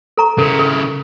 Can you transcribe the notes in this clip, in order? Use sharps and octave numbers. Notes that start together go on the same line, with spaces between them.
A4 A#5 C#6
C#3 E4 A4 A#4
A4